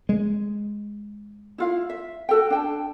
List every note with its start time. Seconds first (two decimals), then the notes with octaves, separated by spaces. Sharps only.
0.09 G#3
1.58 E4 F4 F5
1.90 E5
2.29 F#4 A4 G5
2.50 D4 G5 A5